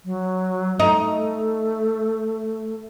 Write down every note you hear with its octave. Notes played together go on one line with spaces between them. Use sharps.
F#3
A3 D#4